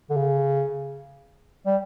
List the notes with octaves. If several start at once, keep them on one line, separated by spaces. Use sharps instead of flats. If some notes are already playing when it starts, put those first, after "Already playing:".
D3
C#3
G3